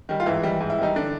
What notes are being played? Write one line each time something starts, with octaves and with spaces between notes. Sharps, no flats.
D#3 G3
F4
G#2 E3 E4
D#3 G3
G#2
E4
D#3 G3 D#4
D3 D4